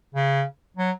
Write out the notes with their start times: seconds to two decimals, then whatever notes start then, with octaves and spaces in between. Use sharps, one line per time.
0.15 C#3
0.77 F#3